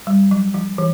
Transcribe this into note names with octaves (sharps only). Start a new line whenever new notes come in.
G3
F#3
F3
E3